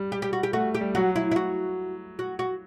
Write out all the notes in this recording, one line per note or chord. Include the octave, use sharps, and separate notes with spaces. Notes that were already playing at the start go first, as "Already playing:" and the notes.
Already playing: G3
G4
G4
F#4
G4
A3 F#4
G4
G3
F#3 F#4
E4
E4
F#4
F#4
F#4